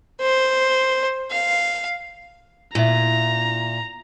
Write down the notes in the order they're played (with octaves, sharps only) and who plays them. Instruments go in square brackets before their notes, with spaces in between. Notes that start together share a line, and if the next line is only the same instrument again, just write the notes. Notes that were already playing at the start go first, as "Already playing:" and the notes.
[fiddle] C5
F5
[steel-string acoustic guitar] A#2 [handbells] E4 E5 [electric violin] A#5